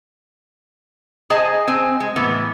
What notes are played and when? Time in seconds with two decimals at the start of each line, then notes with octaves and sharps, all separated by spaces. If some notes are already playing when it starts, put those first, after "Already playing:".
1.30 G#4 C5 D#5 G#5 A5
1.67 C4 C5 G#5
2.00 G#3
2.16 A2 E3 B3